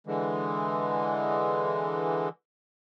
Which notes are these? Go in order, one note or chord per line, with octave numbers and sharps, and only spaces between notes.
D3 E3 G#3